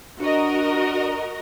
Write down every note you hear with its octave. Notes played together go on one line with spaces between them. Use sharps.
D4 F#4 A#4 D#5